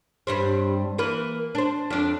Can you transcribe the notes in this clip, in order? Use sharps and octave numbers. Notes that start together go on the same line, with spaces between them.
G2 G3 C4
E3 A#3 B4
D4 C5
F2 D4